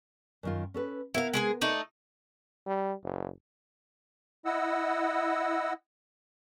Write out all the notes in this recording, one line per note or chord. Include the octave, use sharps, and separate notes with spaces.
F#2 D#3 F4
C#4 A4 B4
B3 E4 A#4 F5
G#3 A3 G#4
A3 D#4 D5
G3
F#1
E4 D#5 F#5 E6